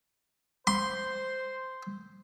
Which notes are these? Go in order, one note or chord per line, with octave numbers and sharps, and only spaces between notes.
C5 C6